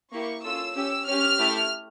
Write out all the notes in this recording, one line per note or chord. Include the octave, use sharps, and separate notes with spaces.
A#3 E4 G4 C#6
C#4 F4 A4 E6
C#4 G4 E6
C#4 G4 F6
A3 E4 G4